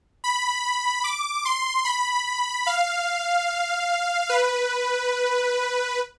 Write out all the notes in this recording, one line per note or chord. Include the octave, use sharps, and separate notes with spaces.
B5
D6
C6
B5
F5
B4